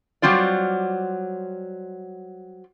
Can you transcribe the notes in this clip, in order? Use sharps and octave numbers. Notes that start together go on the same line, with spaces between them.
F#3 G3 C4 F4 D5